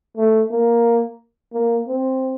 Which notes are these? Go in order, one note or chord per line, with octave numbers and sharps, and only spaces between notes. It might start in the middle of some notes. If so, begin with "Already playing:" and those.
A3
A#3
A#3
C4